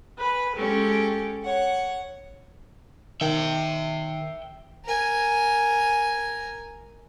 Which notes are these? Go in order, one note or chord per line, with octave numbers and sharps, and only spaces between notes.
B4 G#5 B5
G#3 C#4 G4 A4 G5
C#5 F#5
D#3 E5 G5
A#4 G#5